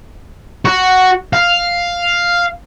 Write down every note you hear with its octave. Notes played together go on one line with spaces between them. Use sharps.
F#4
F5